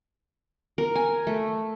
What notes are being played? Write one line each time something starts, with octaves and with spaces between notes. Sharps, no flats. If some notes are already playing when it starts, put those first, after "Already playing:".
A#4
G#5
A3